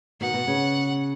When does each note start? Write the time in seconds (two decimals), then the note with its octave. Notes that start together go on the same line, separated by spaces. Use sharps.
0.21 B2 D#3 F#5
0.34 B2
0.47 C#3